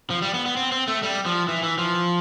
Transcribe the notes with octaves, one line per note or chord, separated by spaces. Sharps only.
F3
G3
B3
B3
C4
C4
A3
G3
F3
E3
E3
F3